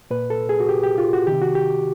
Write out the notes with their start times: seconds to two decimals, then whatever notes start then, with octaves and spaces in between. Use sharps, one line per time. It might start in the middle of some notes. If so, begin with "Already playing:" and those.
0.11 A#2 B4
0.30 A4
0.49 G#4
0.60 F#4
0.69 G4
0.84 G4
0.98 F4
1.13 F#4
1.27 C3 D#3 G4
1.42 F#4
1.55 G4